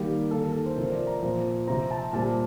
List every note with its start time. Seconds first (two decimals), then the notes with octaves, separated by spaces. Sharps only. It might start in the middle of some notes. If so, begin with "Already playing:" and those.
Already playing: D#3 G3 A#3 G4
0.31 D#3 A#3 A4
0.42 A#4
0.53 A4
0.66 C5
0.76 C3 F3 C4 A#4
0.87 C5
0.91 D5
1.07 A#5
1.22 A#2 F3 C4
1.67 C3 F3 C4 A#5
1.91 A5
2.13 A#2 G3 C4 A5